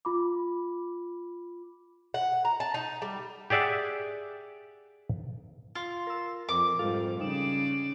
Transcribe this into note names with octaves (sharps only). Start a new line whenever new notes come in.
F4 B5 D6
F#5
A#5
A5
D#4
G3
G4 G#4 D5 E5 F#5
F4
A#4 E6
F2 A#4 D6
F2 G#2 G3 F4 A4 F5
C#3 G3 D#4 D5 E7